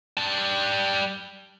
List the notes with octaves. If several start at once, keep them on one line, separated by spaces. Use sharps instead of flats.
G3 A5